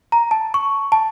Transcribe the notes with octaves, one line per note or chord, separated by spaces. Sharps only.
A#5
A5
C#6
A5